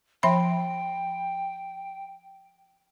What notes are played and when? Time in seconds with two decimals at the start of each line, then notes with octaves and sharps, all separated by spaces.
0.23 F3 E5 G5 B5